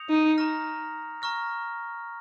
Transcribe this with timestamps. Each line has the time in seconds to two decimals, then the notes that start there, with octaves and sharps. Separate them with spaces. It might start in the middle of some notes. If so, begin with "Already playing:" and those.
Already playing: D#6 G6 A#6 C#7 F7
0.09 D#4
0.38 A#5 C#6 F6 A#6
1.22 A#5 C#6 F6 A#6